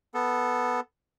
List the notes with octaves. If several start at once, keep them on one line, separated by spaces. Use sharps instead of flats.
B3 A4